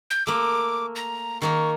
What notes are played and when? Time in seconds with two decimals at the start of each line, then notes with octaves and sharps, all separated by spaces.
0.10 G6
0.27 A3 A#3 D6
0.96 A#5
1.42 D#3 A#3 D#4 C#6